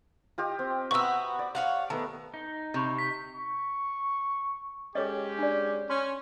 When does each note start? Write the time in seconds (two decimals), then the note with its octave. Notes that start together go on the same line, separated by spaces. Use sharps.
0.38 F4 G4 D#5
0.59 C4
0.91 B3 F#4 B4 E5 A#5 C#6 E6
1.39 D5
1.55 C#5 F5 F#5
1.90 D#3 A3 B3
2.34 D#4
2.74 C3 B5 C#6 G6
2.99 B6
3.35 C#6
4.95 G#3 C#4 G4 A4 C#5 D#5
5.38 D4 D5
5.90 C#4 C6